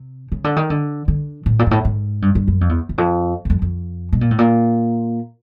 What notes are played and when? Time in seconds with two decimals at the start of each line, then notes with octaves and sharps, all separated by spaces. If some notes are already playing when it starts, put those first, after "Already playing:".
Already playing: C3
0.32 C#3
0.44 D3
0.56 D#3
0.70 D3
1.08 D3
1.46 A2
1.59 A#2
1.66 G#2
1.71 A2
1.85 G#2
2.22 G2
2.35 G2
2.48 F#2
2.61 F2
2.69 E2
2.89 E2
2.98 F2
3.45 E2
3.50 F2
3.62 F2
4.12 B2
4.21 A#2
4.31 A2
4.38 A#2